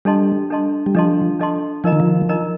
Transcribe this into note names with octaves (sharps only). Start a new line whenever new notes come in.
G3 D4 A4 D#5 A5 C6
D4 A4 D#5 A5 C6
G3
F3 D4 A4 D#5 A5 C6
D4 A4 D#5 A5 C6
F3 D#4 A#4 D#5 A#5
D#3
F3
D#4 A#4 D#5 A#5